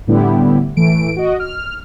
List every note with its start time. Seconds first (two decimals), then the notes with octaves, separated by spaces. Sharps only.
0.07 A2 D3 G3 B3 E4 G4
0.77 A2 E3 A3 D7
1.16 F#4 D#5
1.40 F6